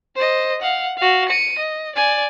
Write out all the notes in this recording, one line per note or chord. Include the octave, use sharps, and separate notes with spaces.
C5 D#5
F5 F#5
F#4 F5
C#7 D#7
D#5
D5 G#5